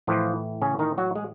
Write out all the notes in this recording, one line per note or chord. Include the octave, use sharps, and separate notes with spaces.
A2 E3 F3 F4
C#3 C#4
D#3 D#4
F#3 F#4
G#3 G#4